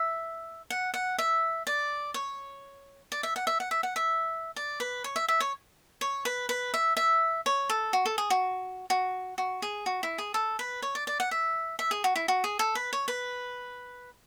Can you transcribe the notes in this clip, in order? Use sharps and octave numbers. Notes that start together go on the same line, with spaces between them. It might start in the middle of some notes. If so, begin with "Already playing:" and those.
Already playing: E5
F#5
F#5
E5
D5
C#5
D5
E5
F#5
E5
F#5
E5
F#5
E5
D5
B4
C#5
E5
E5
C#5
C#5
B4
B4
E5
E5
C#5
A4
F#4
A4
G#4
F#4
F#4
F#4
G#4
F#4
E4
G#4
A4
B4
C#5
D5
D5
F#5
E5
E5
G#4
F#4
E4
F#4
G#4
A4
B4
C#5
B4